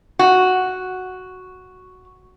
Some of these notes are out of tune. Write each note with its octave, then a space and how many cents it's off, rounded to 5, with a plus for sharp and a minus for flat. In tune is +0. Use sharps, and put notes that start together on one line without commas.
F#4 +0